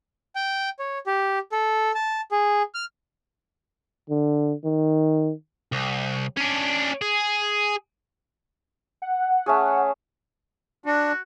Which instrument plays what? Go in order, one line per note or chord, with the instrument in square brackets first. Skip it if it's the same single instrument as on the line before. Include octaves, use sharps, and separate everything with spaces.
[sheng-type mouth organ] G5
C#5
G4
A4
A5
G#4
F6
[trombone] D3
D#3
[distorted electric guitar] C2
C#4 D4
G#4
[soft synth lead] F#5
[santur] A3 C#4 G#4
[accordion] D4 [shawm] F#4